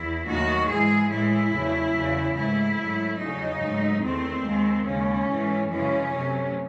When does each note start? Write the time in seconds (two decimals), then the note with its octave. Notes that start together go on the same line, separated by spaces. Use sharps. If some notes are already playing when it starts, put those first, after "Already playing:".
Already playing: E2 E4
0.27 D#2 D#3 F#3 A3 F#4
0.69 G#2 E3 G#3 G#4
1.10 A2 E3 G#3 E4
1.52 E2 C#3 F#3 A3
1.94 E2 C#3 F#3
2.35 G#2 E3 A3 E4
2.77 G#2 F#3 A3
3.19 E2 C#3 F#3 D#4
3.61 G#2 F#3 A3
4.02 E2 D#3 A3 C4
4.44 D#2 D#3 G#3
4.85 D#2 C#3 G#3 C#4
5.27 G#2 E3 A3
5.69 F#2 C#3 E3 G#3 C#4
6.10 C3 F#3 A3